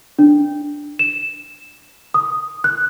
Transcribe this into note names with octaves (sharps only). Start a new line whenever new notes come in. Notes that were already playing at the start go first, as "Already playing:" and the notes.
D4
E7
D#6
F#6